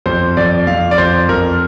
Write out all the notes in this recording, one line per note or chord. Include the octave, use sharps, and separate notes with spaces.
F2 C5
F2 D5
F2 F5
D5
F2 C5
F2 A#4